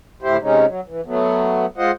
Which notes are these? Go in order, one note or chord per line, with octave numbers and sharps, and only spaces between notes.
D2 A2 E4 G4 C5
C3 G#3 C#4 D#4
F#3
E3
F#3 A3 B3
G#3 F4 C5 D#5 F#5